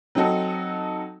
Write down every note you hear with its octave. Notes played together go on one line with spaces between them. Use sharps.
F#3 C4 D#4 F#4 A4